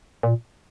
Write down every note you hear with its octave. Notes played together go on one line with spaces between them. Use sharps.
A#2